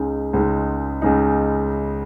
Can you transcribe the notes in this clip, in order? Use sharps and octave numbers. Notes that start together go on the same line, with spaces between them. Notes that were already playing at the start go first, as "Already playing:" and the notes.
Already playing: C#2 C#3 G#3 D#4
C#2 C#3 G#3 D#4
C#2 C#3 G#3 D#4